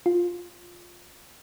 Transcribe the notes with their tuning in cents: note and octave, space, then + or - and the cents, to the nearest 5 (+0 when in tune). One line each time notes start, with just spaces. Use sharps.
F4 +10